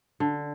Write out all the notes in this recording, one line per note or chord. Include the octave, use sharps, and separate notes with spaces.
D3